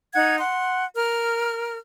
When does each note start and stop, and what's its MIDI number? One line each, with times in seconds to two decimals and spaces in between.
0.14 0.36 63
0.14 0.36 78
0.14 0.36 92
0.38 0.84 78
0.38 0.84 84
0.94 1.77 70
0.94 1.77 89